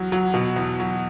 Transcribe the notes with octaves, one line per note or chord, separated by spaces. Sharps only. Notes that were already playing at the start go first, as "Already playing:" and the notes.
Already playing: E2 F#3
F#3
B2
E2
F#3